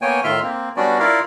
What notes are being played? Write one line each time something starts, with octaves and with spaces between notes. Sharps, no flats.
A#3 B3 C#5 G5 G#5
A2 D#3 F4 E5 C6 F6
A#3 C4
G3 B3 C#4 D4 F#4 D5
E4 F4 A#4 D5 F5